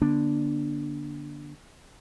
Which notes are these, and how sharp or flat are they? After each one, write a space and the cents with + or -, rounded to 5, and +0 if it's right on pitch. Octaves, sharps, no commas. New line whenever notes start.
D3 +0 B3 -45 D4 +0